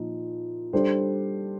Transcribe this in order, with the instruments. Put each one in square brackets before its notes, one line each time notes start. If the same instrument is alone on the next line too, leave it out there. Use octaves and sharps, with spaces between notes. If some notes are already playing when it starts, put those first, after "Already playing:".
Already playing: [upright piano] A#2 F3 D#4
G3 D4 A4 C5